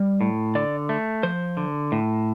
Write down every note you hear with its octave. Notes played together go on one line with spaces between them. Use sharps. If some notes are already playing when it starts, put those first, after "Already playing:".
Already playing: G3
A2
D3 D5
A3
F3 C5
D3
A2